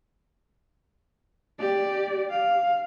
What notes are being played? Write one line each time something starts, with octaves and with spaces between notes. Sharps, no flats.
G4 D5
F5